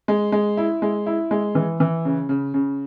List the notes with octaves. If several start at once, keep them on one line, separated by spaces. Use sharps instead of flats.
G#3
G#3
E4
G#3
E4
G#3
E3
E3
C#3
C#3
C#3